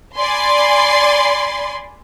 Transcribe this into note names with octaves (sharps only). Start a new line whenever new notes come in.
D5 G#5 B5 C6